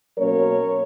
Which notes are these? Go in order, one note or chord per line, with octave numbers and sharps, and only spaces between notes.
B2 F#3 A#3 C#4 A#4 C#5